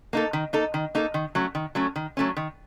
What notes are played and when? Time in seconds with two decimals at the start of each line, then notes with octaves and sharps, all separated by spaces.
0.13 A#3 D#4 A4
0.33 D#3
0.53 A#3 D#4 A4
0.74 D#3
0.95 A#3 D#4 A4
1.14 D#3
1.35 F#3 A3 C#4
1.55 D#3
1.75 F#3 A3 C#4
1.96 D#3
2.17 F#3 A3 C#4
2.37 D#3